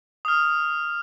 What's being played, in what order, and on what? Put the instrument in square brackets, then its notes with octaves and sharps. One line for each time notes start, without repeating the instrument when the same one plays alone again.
[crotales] D#6 F6